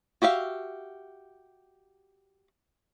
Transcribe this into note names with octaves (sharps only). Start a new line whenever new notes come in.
F#4 G4 E5 F5